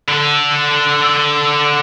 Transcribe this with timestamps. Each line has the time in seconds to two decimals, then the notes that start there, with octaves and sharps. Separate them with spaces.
0.08 D3 A4